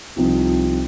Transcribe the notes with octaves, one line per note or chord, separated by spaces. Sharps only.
C2 C3 F3 C4 D#4